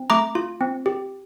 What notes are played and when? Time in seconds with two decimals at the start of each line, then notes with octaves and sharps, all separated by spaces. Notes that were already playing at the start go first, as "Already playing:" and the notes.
Already playing: C4
0.10 A3 A#5 D6
0.35 F4
0.61 C4
0.86 G4